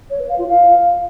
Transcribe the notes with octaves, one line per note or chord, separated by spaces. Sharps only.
C#5
B4
F5
F4
F5